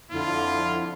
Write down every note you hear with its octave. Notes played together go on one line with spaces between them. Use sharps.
F2 D3 E4 F4